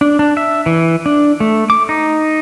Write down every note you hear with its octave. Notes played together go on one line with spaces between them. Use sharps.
D4
D4
E5
E3
D4
A3
D6
D#4